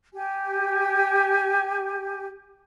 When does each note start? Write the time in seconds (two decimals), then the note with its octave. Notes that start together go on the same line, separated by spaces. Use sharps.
0.13 G4 G#5